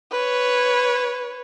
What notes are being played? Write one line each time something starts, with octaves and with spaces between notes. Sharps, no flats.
B4 C#5